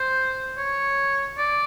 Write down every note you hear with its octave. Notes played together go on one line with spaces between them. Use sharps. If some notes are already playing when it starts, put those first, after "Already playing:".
Already playing: C5
C#5
D5